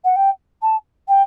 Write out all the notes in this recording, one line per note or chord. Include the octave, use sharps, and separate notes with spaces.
F#5
G5
A5
G5